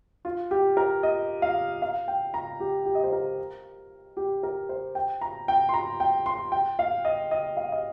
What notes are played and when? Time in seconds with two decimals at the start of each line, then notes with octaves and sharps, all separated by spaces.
0.25 F4
0.51 G4
0.77 A#4
1.03 D#5
1.42 F5
1.82 F5
2.08 G5
2.34 A#5
2.60 G4
2.86 G4
2.95 D#5
3.04 C5
3.12 A#4
4.17 G4
4.43 A#4
4.69 C5
4.95 G5
5.21 A#5
5.48 G5
5.69 C6
5.74 A#5
6.00 G5
6.26 C6
6.52 G5
6.79 F5
7.05 D#5
7.31 D#5
7.57 F5
7.72 D#5